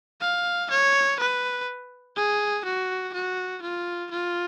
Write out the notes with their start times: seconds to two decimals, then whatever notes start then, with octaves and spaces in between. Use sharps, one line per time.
0.21 F5
0.70 C#5
1.20 B4
2.17 G#4
2.65 F#4
3.14 F#4
3.62 F4
4.11 F4